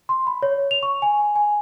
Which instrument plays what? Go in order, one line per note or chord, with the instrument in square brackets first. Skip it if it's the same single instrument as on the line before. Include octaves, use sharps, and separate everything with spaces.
[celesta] C6
B5
C#5
F7
C#6
G#5
G#5